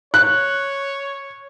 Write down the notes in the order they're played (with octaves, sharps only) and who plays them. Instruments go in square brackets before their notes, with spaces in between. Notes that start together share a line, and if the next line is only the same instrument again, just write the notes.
[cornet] C#5 [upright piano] F#6